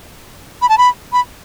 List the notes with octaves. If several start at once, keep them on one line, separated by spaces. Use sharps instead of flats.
B5
A5
B5
B5